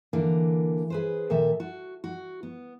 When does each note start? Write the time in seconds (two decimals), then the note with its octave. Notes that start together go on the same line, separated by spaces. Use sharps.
0.13 D3 E3 A#3
0.90 G#4 B4 C5
1.30 A#2 D#3 A4 E5
1.60 F#4
2.04 F#4
2.43 B3